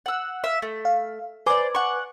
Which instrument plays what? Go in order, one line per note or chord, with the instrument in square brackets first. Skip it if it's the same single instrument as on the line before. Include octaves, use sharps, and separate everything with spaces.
[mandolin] F#5 E6
E5 F5
A3
[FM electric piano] F5
[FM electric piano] B4 G#5 D6 [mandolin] C5 D5
[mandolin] F#5 C#6